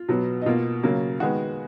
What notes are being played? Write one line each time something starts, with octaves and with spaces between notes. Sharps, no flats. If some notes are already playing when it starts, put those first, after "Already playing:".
Already playing: F4
B2 F#3 B3
D#4
B2 A#3 F4
C#3 F#3 A#3
D#3 G#3 B3 F#4